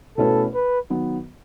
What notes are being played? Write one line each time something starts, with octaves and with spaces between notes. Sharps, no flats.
B2 A3 C#4 E4 A4 B4
B4
D#3 F#3 B3